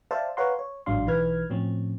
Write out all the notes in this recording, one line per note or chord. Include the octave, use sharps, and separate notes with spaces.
C5 D5 E5 F5 A5
B4 C#5 F5 F#5 A#5 C6
C#5
A1 G#2 F#3 D4 F5 C6
B1 E3 D#4 B4 F6 G#6
A2 F3 C4 C#4